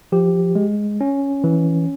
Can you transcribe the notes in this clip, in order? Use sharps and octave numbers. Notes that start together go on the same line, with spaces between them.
F3 G4
G#3
C#4
E3